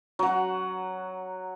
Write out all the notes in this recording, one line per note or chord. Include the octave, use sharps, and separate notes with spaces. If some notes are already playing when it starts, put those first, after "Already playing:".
F#3 F#5